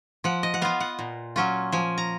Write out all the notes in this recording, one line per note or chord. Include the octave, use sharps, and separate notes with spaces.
F3 F#5
D#5
F#5
B3 F4 F5
F#5
A#2
F#3 C#4 F4
F3 G#5
A#5